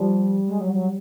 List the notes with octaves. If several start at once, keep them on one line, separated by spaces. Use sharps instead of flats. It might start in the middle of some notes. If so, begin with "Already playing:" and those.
Already playing: F3 G3
G#3
F#3
F#3